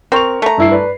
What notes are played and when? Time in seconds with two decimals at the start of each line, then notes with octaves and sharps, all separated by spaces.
0.12 C4 A#4 C#6 F7
0.42 A3 A#5
0.58 G2 E4 C7
0.72 B4 D5